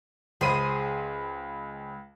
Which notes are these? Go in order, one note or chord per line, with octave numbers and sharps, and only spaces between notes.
C#2 G#4 C5 B5 D#7